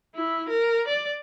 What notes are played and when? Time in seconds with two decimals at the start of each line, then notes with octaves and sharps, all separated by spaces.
0.15 E4
0.49 A#4
0.88 D5